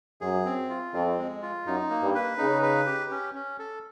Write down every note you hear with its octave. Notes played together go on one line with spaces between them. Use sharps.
F#2 G#4
C4
F4
F2 C4
G#3
F4
F#2 D#4
A#3
G2
B4
C#3 D#4
B4
G4
C#4
C#4
A4